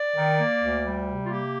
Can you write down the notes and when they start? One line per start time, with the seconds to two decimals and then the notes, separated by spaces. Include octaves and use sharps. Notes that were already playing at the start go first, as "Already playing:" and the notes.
Already playing: D5
0.16 D#3
0.38 A#3
0.62 D2
0.85 G3
1.07 C3
1.25 F4
1.29 A#3 G4